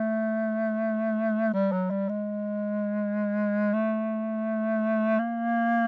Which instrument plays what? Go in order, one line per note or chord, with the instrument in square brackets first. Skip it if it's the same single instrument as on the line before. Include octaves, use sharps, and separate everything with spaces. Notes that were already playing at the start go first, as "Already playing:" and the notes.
Already playing: [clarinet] A3
G3
F#3
G3
G#3
A3
A#3